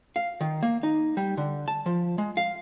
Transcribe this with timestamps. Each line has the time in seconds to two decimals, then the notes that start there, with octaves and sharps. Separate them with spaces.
0.16 F5
0.41 D#3
0.63 A#3
0.83 D#4
1.17 G3
1.37 D3
1.68 A5
1.86 F3
2.18 G#3
2.37 F5